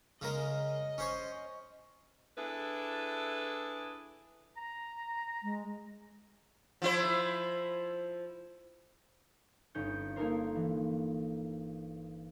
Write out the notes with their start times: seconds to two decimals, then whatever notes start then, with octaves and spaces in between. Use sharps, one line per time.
0.21 C#3 G#3 A#4 D#5
0.98 C#4 C5 C#5
2.37 D4 E4 G#4 A4 B4
4.57 A#5
5.43 G#3
6.82 F3 E4 C5
9.75 G1 C#4 D#4 G6 C#7
10.16 A#3 D#4 A4 A#4 C5
10.56 E3